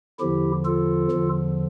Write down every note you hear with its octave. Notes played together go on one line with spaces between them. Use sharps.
E2 D3 F3 E4 G4
F4 A4
E2 D3 F3